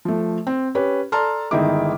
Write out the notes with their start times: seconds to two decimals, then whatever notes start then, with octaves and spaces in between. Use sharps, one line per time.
0.05 F3 A3
0.47 C4
0.75 C#4 G4 B4
1.12 A4 D5 A5 A#5 C6 F6
1.51 G1 D#3 G#3 D#4 E4 D6